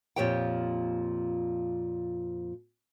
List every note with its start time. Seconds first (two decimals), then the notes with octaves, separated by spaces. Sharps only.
0.16 F2 A#2 F3 G4 C#5 G5